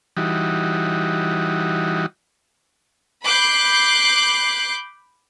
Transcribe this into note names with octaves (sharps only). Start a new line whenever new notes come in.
E3 G3 D#4 F#4
B5 D6 F#6 G6 C7